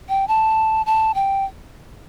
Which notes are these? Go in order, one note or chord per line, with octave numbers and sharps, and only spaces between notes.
G5
A5
A5
G5